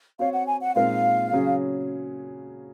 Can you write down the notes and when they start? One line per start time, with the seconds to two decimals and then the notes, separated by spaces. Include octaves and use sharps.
0.19 C4 F#4 C#5 F5
0.33 F#5
0.47 G#5
0.61 F#5
0.75 A#2 G#3 C4 D#4 A#4 F5
1.32 C#3 F#3 C#4 G#4